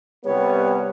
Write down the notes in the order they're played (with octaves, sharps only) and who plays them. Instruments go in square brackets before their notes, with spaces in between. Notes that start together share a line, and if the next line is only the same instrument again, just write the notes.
[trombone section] C2 G3 B3 [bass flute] C#5